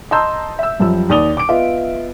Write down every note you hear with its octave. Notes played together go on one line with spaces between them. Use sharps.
D#5 A5 A#5 C6 E6 G6
E5 E6
F#2 F3 G3 E6
D#2 D5 D#6 F7 G7
D6 D7
B3 F4 D#5 E5